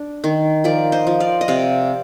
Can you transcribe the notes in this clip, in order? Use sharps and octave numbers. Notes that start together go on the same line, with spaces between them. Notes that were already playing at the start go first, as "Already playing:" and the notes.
Already playing: D4
D#3
F3 A#4 D5
C5 D#5
F3
D5 F5
D#5
C3 D5 F5